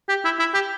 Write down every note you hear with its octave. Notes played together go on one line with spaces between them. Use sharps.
G4
E4
E4
G4